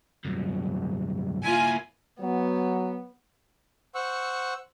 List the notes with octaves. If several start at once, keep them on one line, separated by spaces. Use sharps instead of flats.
C2 F#2
A#3 E4 F4 G#5
F#3 B3
C5 F#5 C#6 E6